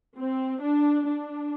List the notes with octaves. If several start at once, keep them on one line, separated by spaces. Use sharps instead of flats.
C4
D4
D4